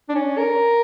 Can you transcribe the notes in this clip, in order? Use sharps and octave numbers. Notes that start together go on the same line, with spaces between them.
D4
C#4
A#4